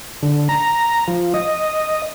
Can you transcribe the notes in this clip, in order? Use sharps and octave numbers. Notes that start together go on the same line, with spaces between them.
D3
A#5
F3
D#5